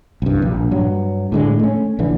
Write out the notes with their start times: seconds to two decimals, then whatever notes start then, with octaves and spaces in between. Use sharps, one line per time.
0.22 C2 G2
0.42 A#1
0.71 G2 F#3
1.32 A2 D3 G#3
1.59 A3 C#4
1.99 A#1 D3 E3